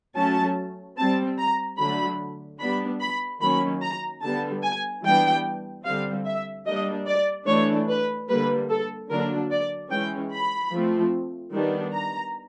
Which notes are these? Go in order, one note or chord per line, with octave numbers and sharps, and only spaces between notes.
F#3 A3 C#4 A5
G3 C4 A5
A#5
D3 F#3 A3 D4 B5
G3 B3 D4 B5
B5
D#3 F#3 A#3 C#4 B5
A#5
D3 G3 B3 A5
G#5
E3 G3 B3 D4 G5
D3 G3 C4 F5
E5
G3 A#3 D4 D#5
D5
E3 A3 D4 C#5
B4
D3 G3 A#3 B4
A4
D3 F#3 A#3 D4 A#4
D5
E3 G#3 C#4 G5
B5
F3 A3 C4
D#3 G3 B3 D4
A#5